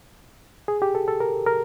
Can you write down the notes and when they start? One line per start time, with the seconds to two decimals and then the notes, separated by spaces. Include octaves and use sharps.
0.68 G#4
0.82 G4
0.95 A4
1.08 A4
1.20 A#4
1.46 A#4